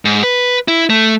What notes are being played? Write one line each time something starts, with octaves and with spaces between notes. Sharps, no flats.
G#2
B4
E4
A3